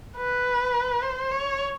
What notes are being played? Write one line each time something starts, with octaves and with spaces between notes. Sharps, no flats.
B4
C5
C#5